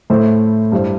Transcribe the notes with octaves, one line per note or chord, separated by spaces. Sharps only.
A2 A3 E4 C5
G2 G3 E4 C5